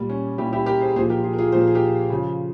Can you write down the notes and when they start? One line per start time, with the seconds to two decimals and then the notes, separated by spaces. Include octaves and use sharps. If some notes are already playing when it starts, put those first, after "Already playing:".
Already playing: A#2 G3
0.09 C#4
0.38 A#2 G3 E4 G4
0.53 E4 G4
0.66 G4 A#4
0.81 G#4 C5
0.96 A#2 G#4 C5
0.99 F3
1.10 G4 A#4
1.24 F4 G#4
1.34 A#4
1.38 F4 G#4
1.52 A#2 F3 C5
1.60 A#4
1.68 G#4
1.75 G4 A#4
2.10 C#3 F3